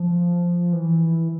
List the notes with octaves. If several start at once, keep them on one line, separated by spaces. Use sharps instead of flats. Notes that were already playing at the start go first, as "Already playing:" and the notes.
Already playing: F3
E3